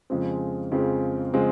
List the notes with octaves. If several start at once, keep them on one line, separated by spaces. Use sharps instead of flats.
F2 C#3 F3 G#3 C4
F2 C#3 F3 G#3 C4
C#3 F3 G#3 C4